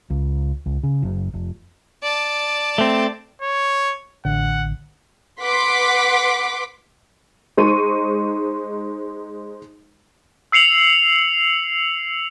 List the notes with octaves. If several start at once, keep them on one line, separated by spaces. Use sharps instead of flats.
C#2
C#2
C#3
F#1
F1
D5 A5
A3 C4
C#5
A1 D3 F#5
B4 F#5 C6 D6 B6
G#3 D#4 C5 C#6 D#7
E6 C7 C#7 F7 F#7